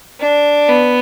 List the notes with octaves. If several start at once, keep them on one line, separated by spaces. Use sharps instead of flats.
D4
B3